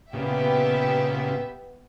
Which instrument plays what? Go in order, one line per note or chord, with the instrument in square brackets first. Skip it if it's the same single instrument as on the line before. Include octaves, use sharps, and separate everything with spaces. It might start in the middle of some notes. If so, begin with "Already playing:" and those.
[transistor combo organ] A#2 C#3 [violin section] B3 G4 E5